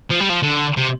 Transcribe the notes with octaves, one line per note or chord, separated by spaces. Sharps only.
F3
G3
F3
D3
C3